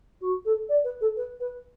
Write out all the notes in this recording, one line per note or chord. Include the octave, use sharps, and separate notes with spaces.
F#4
A4
D5
B4
A4
B4
B4